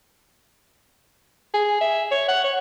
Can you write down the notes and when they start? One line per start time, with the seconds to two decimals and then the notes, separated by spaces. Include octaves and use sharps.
1.54 G#4
1.81 E5
2.11 C#5
2.28 F#5
2.44 C#5